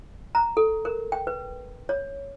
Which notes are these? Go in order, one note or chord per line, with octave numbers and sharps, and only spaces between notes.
A#5
A4
A#4
G5
B4
C#5